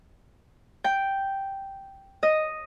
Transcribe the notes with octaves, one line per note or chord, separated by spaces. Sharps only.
G5
D#5